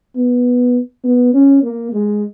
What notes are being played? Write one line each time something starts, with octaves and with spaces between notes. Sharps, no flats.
B3
B3
C#4
A#3
G#3